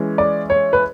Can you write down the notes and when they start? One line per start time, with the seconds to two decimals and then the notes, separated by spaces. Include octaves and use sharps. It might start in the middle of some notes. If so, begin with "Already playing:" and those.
Already playing: E3 G#3 C#4
0.18 D5
0.50 C#5
0.73 B4